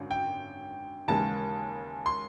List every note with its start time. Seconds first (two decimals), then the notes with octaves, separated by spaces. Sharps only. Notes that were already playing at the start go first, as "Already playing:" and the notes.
Already playing: G#1 F#2 D3
0.11 G5
1.08 D#2 C#3 E3 G#3 A5
2.06 C6